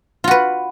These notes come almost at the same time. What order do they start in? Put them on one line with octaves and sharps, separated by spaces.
F4 F#4 B4